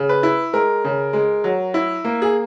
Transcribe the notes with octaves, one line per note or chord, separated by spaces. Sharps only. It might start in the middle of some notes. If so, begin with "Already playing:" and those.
Already playing: C#3
B4
E4
G#3 A#4
C#3
G#3
F#3
E4
A#3
G#4